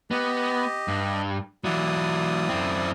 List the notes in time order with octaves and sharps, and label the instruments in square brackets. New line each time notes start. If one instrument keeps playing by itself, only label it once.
[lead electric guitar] B3 [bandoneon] G4 D#5
[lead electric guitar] G2
[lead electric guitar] E3 F#3 [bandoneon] E4 D5 D#6
[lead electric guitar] F#2 C4